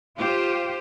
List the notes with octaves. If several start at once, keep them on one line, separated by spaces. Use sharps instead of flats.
F4 G4 C5